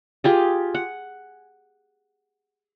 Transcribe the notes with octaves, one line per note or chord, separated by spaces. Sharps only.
F4 G4 G#4
F#5